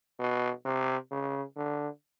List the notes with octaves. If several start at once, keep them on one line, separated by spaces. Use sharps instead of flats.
B2
C3
C#3
D3